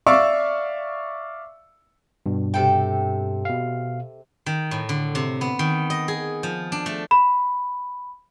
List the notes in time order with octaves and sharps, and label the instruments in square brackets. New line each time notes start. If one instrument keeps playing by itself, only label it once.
[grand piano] D5 E5 F5 C#6 D6 E6
[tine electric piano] G2 B2
[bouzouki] C3 A4 G5
[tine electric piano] B2 F5
[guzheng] D#3
A2
D3
C3
B3
D#3
D#5
G#4
F3
D4
A3
[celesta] B5